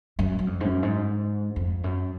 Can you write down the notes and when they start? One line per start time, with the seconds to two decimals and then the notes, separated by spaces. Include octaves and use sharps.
0.19 F#2
0.39 F#2
0.47 F2
0.60 G#2
0.65 F#2
0.83 G#2
1.56 F2
1.84 F#2